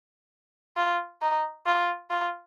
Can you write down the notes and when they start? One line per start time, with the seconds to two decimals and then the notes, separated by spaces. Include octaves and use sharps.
0.77 F4
1.22 D#4
1.66 F4
2.10 F4